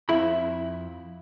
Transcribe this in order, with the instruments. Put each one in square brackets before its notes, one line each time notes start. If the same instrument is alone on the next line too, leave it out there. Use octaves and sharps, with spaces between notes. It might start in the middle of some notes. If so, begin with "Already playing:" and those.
[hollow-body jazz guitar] F2 E4 B5